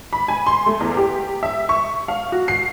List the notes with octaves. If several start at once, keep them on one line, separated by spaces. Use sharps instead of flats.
B5
G#5
C6
A3
E2
G4
E5
C#6
F5
F#4
C7